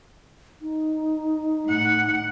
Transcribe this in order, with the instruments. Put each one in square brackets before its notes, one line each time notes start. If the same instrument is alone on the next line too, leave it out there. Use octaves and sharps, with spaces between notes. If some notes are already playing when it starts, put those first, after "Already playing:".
[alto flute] D#4
[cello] A2 F#5